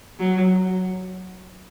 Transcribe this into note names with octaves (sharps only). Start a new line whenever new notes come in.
F#3